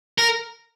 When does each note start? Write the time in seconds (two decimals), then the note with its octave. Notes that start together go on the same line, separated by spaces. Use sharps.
0.18 A#4